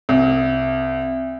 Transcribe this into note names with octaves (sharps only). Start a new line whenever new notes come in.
C2